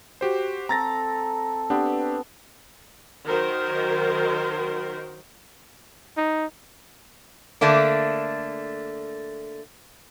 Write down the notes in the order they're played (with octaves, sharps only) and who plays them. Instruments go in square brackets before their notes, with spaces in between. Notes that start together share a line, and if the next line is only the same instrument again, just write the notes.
[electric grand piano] F#4 G4 C5
[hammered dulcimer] C4 A4 [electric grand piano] A#5 A6 A#6
[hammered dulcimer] B3 C4 B4 [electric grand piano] D4 G4
[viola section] D#3 F#3 F#4 A#4 C5
[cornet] D#4
[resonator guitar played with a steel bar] D3 A3 A#3 D4